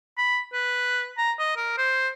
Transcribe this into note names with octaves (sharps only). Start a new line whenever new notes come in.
B5
B4
A#5
D#5
A#4
C5